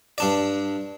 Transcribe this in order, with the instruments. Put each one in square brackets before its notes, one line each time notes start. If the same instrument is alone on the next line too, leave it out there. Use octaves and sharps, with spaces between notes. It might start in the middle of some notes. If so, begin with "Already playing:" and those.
[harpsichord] G2 D4 D5